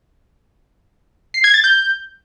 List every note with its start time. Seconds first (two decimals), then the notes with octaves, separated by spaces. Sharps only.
1.34 C7
1.44 G#6
1.54 A6
1.64 G6